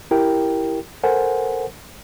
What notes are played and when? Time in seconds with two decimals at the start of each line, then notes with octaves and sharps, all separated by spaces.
0.11 E4 G4 A#4 G5
1.03 A4 A#4 C5 F#5 G#5